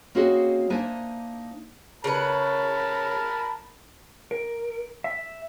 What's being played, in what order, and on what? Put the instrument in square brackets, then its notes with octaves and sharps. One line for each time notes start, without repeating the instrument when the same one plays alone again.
[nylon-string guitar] A#3 C4 C#4 F#4 G#4 D#5
A#3 D4 D#4 C5 E5 G#5
[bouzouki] C#3 B4 [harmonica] A#4 A5 B5
[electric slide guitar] A#4
E5